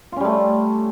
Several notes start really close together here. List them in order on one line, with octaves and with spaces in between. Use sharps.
F4 C#4 G3 A3